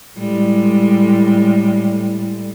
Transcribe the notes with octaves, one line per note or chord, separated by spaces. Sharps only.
A2 G3 G#3